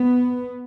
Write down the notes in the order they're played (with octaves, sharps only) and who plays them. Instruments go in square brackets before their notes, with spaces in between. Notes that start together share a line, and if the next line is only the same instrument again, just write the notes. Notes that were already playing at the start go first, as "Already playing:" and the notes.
Already playing: [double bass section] B3